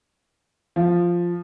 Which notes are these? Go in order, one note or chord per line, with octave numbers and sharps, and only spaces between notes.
F3